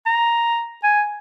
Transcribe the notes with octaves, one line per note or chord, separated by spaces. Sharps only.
A#5
G#5